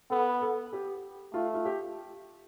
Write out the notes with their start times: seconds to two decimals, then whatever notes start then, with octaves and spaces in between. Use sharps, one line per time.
0.10 B3 A4
0.42 A4
0.73 G4
1.34 A3 F4
1.54 F4
1.65 G4